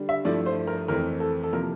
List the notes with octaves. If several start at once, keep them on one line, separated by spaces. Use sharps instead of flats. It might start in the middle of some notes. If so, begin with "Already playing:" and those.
Already playing: D3 G3 D4
E5
G2 F3 A3 E4 D5
C5
A#4
F2 E3 A3 C4 A#4
A4
A4
C3 F3 A#3 E4 A#4